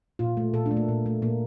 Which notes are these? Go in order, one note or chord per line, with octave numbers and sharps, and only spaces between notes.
A#2 F4
A3
A#2 A4
D4
A3
A#3
A#2
A3
A#2 A#3